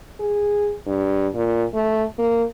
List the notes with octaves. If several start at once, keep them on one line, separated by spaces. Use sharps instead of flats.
G#4
G2
A#2
A3
A#3